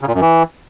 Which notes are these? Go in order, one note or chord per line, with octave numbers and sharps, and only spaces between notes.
C#3
A#2
F#2
E3